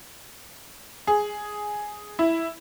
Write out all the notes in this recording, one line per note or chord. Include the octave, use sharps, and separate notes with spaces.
G#4
E4